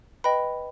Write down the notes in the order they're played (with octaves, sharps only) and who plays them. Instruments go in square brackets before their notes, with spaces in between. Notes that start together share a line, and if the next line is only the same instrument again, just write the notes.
[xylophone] B4 D#5 G5 B5